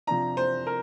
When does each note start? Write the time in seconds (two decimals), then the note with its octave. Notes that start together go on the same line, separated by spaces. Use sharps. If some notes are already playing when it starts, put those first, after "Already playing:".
0.07 C3 F3 D4 A#5
0.37 C5
0.67 A#4